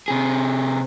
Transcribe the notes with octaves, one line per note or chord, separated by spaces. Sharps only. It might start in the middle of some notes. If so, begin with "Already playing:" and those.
C3 G#4